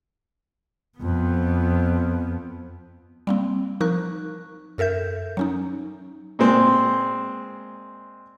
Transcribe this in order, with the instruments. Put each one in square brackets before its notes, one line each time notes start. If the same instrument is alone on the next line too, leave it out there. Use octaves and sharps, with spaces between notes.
[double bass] F2 B3
[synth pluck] G3 A#3 C4
F3 D#4 A#4 C#6 F#6
F#2 A4 A#4 E5 G6
F#3 C#4 D#4
[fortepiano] A#2 G#3 C4